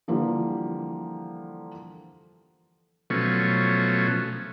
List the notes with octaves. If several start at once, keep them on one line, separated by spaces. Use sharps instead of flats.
D3 E3 F3 G3 A#3
B2 F3 F#3 A3 C#4